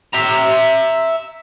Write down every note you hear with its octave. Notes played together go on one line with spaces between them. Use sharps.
E5 A#5